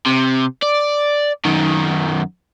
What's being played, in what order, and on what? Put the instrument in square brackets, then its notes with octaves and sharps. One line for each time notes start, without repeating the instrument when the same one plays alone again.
[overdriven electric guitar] C3
D5
F#2 D#3